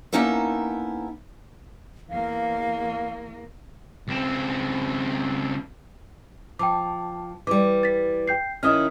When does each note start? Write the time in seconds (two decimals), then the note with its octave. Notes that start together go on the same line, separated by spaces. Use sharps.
0.13 A#3 B3 C#4 D#4 E4 A4
2.10 E2 A#3 F5
4.08 C#2 C4
6.59 F3 G5 A5 D6
7.47 E3 G3 D6
7.83 A6 B6
8.28 G5 G6 C7
8.63 D#3 C#4 E4 D#5 D#6 F6